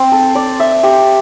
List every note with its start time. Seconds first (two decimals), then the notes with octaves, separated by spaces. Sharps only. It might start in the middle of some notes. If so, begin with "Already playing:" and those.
Already playing: C4 C5
0.12 A4
0.35 D5
0.60 E5
0.83 G4